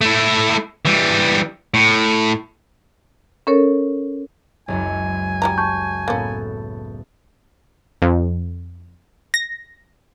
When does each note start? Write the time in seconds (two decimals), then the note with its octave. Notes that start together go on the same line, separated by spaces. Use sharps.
0.01 A3 E4
0.85 E3 G3
1.74 A2
3.47 C#4 A4 A#4 C#5
4.68 F#1 C#2 F#2 G#5
5.42 G3 E4 A#5
5.58 A5 C#6 G6
6.08 A2 A#3 B3 C#4 A4
8.02 F2
9.34 A#6